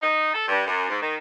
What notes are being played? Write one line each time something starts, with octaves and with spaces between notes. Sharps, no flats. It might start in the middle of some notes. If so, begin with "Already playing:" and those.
D#4
A4
G2
F#2
G#2
D#3